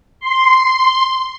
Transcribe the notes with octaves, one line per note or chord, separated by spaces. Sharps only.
C6